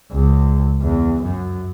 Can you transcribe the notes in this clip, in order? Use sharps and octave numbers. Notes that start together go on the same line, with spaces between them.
C#2
E2
F#2